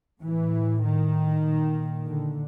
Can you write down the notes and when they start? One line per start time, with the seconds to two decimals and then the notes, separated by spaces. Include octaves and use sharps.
0.22 A2 E3
0.84 D#3
1.45 A#2
2.07 D3